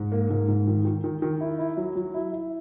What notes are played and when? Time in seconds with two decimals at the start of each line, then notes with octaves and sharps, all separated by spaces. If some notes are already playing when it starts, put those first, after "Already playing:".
Already playing: G#2
0.12 A#3
0.30 G#2
0.48 G#2
0.67 D#3
0.85 D#3
1.04 D#3
1.22 D#3
1.41 E4
1.59 E4
1.77 F#3
1.96 F#3
2.14 E4
2.33 E4